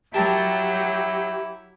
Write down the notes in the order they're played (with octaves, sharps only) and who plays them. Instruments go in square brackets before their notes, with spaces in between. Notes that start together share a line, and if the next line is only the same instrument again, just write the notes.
[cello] F#3 [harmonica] E4 [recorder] G4 [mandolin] A#4 G5 A5